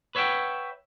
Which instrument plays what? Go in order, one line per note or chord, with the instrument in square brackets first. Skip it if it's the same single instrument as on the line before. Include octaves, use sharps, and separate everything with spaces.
[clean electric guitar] B4 C#5 E5 F#5 G5